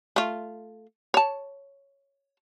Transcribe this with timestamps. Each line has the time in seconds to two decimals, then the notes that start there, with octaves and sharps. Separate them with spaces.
0.16 A3 F4
1.14 C#5 A5